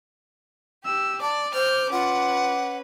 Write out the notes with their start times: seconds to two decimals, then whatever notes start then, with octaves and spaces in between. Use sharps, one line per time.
0.85 G4 E6
1.22 D5 A5 D6
1.54 C5 F6 G6
1.92 C#4 F4 B4 F#5